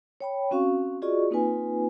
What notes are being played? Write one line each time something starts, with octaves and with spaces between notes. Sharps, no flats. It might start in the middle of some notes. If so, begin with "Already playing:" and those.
C#5 G5 B5
C4 C#4 F#4 F5 C#6
F4 F#4 G#4 D5 D#5 C#6
A#3 C4 D#4 F4 B4 G#5